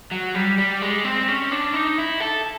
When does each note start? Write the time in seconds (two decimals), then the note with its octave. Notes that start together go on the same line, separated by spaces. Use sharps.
0.11 F#3
0.35 G3
0.58 G3
0.82 G#3
1.04 C4
1.28 C#4
1.52 D4
1.74 D#4
1.98 E4
2.20 A4